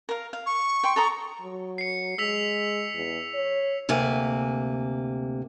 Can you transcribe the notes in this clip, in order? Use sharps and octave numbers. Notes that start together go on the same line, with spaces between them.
A#4 F5
F5
C#6
G5 C6
A4 A#5 D#6
F#3
C7 C#7
G#3 E6 B6 F7
E2
C#5
D2 C3 A#3 G#5